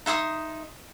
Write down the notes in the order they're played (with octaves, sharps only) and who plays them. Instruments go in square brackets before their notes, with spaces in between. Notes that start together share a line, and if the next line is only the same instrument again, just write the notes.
[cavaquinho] D#4 E5 C6 D#6